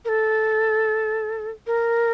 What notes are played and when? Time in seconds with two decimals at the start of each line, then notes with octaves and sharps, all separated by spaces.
0.05 A#4
0.09 A4
1.67 A#4